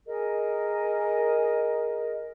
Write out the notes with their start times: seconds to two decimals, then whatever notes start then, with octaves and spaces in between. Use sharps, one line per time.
0.08 G#4 A#4 D#5